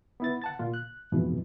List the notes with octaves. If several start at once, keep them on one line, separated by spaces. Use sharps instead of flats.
B3 E4 A6
F#5 A5 A6
A#2 F4
F#6
F2 G#2 B2 E3